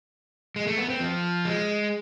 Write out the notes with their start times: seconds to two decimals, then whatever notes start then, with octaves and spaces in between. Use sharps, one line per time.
0.56 G#3
0.67 A3
0.78 B3
0.90 C4
1.00 F3
1.45 G#3